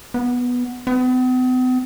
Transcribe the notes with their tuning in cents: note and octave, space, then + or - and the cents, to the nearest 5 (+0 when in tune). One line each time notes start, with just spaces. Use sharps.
B3 -5
B3 +45